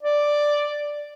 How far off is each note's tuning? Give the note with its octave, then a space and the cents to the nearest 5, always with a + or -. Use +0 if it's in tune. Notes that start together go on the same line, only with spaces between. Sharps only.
D5 +0